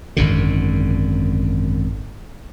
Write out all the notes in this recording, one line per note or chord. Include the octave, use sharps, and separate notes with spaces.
G#1 F#2 D3